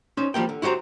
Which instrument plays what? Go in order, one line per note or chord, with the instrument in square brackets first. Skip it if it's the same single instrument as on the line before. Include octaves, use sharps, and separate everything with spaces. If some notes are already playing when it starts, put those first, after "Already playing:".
[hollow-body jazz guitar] C#4 D#4 C5
F3 G3 A#3 G5
D3
E4 F#4 G4 C5 A#5